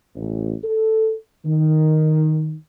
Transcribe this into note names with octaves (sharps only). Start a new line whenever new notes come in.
A1
A4
D#3